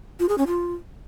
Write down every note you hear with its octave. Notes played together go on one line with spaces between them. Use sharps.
F4
G#4
C#4
F4